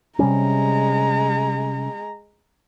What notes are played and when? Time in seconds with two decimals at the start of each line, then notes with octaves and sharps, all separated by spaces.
0.19 C3 G3 G#3 C#4 A#5